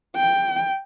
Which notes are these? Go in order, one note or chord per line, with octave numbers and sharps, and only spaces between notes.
G5